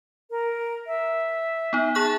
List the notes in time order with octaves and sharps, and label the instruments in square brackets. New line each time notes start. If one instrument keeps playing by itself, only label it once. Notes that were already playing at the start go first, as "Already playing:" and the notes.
[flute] A#4
E5
[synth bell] B3 D#4
[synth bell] G#4 C#6 F#6 [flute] A5